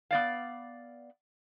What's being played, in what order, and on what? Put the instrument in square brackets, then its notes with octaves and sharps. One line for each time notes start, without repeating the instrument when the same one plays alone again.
[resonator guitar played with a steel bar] B3 D5 F5